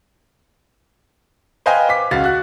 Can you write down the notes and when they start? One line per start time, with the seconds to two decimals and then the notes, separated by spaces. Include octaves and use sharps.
1.66 B4 C5 D#5 F5 G5 G#5
1.89 D6 B6
2.11 C#2 F#4 F5 A6
2.24 F#4 F#6